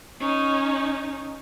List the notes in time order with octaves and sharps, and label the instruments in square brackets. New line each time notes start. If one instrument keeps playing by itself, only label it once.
[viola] C#4 D#4